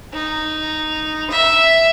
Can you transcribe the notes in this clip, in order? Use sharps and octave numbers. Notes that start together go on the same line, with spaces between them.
D#4
E5